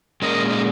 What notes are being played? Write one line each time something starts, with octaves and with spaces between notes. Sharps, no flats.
A#2 G#3 C#4 A#4 D#5
D#4